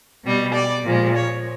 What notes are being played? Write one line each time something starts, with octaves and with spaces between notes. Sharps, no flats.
B2 G3
D5
A#2 F3 G#3
C#5